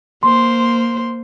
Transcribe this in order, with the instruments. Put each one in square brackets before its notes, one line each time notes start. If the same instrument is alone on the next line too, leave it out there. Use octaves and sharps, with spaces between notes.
[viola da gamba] A#3 C5 [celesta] C6